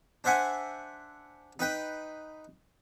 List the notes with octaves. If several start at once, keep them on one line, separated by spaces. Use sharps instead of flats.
D4 C5 E5 F#5 G#5
D#4 B4 G5